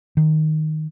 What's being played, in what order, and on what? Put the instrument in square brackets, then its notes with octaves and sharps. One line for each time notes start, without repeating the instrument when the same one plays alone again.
[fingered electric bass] D#3